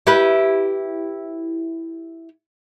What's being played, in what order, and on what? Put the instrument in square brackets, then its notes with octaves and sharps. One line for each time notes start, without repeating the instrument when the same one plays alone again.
[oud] E4 G4 B4